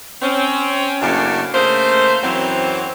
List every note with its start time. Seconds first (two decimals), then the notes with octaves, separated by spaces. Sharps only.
0.22 C4 C#4
1.01 F#2 A2 C#3 F#3 A#3 D4
1.54 C#3 A3 A#3 G#4 C5
2.23 F#2 E3 F#3 C4